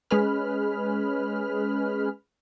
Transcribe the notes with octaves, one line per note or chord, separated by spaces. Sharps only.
G#3 C#4 G#4 B4 B5 F6